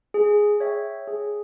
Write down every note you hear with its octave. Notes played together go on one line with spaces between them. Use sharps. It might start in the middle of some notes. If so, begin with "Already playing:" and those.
G#4
C#5 E5 G5
G#4